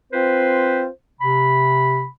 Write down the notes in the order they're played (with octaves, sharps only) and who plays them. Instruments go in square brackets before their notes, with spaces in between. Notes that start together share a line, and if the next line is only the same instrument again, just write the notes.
[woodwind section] C4 F4 B4 C5
C3 B5